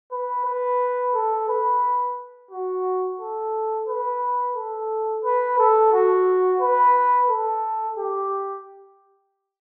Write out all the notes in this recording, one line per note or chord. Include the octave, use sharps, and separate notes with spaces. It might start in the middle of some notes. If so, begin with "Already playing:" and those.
B4
B4
A4
B4
F#4
A4
B4
A4
B4
A4
F#4
B4
A4
G4